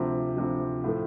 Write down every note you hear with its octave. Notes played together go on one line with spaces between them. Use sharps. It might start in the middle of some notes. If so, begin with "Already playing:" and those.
Already playing: D2 C3 F3
D2 C3 F3
A2 F3 A3